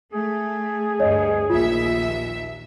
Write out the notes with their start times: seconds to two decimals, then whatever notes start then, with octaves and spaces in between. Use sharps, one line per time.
0.13 A3 G#4
1.00 D2 G2 C#5 D#5
1.50 A#1 D#2 F4 E5